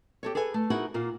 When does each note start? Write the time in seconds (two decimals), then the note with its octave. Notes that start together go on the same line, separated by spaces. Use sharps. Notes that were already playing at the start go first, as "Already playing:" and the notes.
0.23 G4 A4 C#5
0.35 G#4 A4 B4 G#5
0.54 A3
0.70 D#4 E4 F#4 G#4 A#4
0.94 A#2 A#3 F4